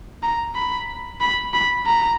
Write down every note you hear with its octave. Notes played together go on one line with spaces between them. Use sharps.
A#5
B5
B5
B5
A#5